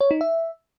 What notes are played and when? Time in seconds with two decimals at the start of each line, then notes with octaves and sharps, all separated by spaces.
0.01 C#5
0.11 D#4
0.21 E5